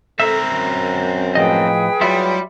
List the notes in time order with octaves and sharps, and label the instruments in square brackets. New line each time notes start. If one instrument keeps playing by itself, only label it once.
[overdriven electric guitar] C4 A#4 [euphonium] A4 [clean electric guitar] E5
[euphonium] F#2
[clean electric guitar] A2 F3 D#5 [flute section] G#4 B4 G5
[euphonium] F#3 [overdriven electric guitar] G3 [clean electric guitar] E4 F4 E5